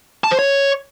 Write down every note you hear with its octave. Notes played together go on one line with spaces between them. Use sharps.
A5
C5
C#5